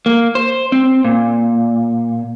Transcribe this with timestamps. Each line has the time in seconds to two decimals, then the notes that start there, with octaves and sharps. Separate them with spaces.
0.06 A#3
0.35 C5
0.72 C4
1.04 A#2